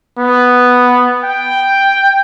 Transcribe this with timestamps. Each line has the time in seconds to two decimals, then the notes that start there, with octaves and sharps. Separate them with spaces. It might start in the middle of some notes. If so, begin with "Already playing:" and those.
0.18 B3
1.24 G5